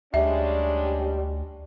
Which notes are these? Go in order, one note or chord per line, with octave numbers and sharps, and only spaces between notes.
D2 G3 G#3 C#4 D4 E5